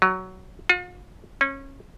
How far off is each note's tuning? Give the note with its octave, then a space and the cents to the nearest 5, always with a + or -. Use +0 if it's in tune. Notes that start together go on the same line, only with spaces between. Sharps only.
F#3 +15
F4 +45
C#4 -25